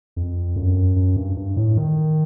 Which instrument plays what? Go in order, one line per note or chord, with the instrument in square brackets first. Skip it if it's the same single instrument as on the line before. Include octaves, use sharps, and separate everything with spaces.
[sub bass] F2
F#2
F#2
G2
G2
A2
D#3